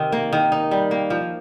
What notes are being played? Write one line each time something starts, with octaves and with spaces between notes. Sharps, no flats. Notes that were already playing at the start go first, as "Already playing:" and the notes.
Already playing: C3 D#3
A#3
D#3
D#4
G3
A#3
F3